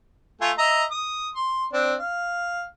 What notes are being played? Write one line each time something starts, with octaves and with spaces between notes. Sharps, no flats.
A3 F4 G#5
D#5 E5 A#5
D#6
C6
C4 D4
F5